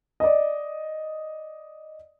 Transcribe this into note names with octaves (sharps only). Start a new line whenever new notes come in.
D5 D#5